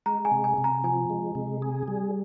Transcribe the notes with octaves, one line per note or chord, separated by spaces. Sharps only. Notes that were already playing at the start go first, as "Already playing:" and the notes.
G#3 A#5
G#5
C3
G#5
C3
A#5
F3 G#5
G#3
C3
G#4
G3